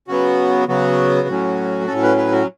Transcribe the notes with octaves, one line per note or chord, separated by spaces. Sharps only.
C#3 F#3 B3 F#4
C#3 F#3 B3 F#4
A2 F#3 C#4
A2 F#3 C#4 A4
B4
B4
F#4